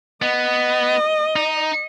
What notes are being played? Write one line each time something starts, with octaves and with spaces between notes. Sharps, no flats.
B3 D#5
D#4